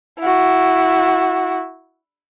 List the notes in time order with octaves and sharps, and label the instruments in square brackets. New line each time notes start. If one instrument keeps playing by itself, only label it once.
[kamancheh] E4 F#4